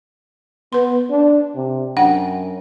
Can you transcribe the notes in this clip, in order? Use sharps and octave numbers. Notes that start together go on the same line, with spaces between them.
B3 B4 C6
D4
C3
F#2 D4 F#5 G5